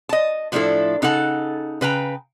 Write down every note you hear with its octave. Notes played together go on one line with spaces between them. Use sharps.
D#5 A5
A2 F3 G3 D4 E4 A4
C#3 D#4 A4 F#5 A5
C#3 B4 G5 A#5